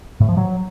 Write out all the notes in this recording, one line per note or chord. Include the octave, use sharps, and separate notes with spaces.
A2
F3
F#3